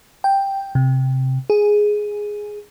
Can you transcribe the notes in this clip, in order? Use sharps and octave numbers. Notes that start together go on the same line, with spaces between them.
G5
C3
G#4